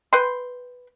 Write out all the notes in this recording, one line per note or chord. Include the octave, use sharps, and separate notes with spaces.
B4 G5 C6